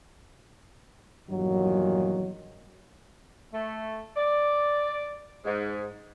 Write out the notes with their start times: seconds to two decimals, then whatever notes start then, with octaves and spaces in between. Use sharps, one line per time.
1.29 E2 G2 A#2 D#3 F#3
3.53 A3
4.16 D5
5.45 G#2